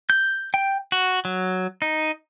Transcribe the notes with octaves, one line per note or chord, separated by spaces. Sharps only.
G6
G5
F#4
F#3
D#4